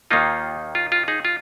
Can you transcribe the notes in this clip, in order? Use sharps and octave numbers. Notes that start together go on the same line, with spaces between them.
D#2 D#3 A#3 D#4 F4
F4
F4
D#4 G#4
F4